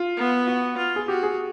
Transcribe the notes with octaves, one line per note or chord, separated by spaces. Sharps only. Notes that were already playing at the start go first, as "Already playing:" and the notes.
Already playing: F4
B3
F#4
F4
G#4
F#4 G4
G#4